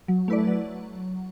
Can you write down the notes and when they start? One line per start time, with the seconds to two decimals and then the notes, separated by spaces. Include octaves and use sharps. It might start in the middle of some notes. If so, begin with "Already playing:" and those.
0.08 F#3
0.28 A3 E4 B4 D5
0.47 F#3